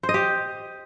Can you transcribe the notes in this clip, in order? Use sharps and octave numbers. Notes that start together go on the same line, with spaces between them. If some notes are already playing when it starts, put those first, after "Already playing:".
C5
D#5
G4